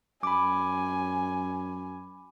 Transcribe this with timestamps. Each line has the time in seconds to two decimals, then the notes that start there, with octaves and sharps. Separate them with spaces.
0.23 F#2 G#5 B5 D6